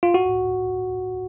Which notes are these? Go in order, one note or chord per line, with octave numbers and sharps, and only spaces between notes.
F4
F#4